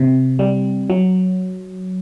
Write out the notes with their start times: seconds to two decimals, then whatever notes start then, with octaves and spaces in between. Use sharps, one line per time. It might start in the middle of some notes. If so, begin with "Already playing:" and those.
Already playing: C3
0.39 G3
0.90 F#3